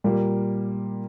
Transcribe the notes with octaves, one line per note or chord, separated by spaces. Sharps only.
A#2 G3 A#3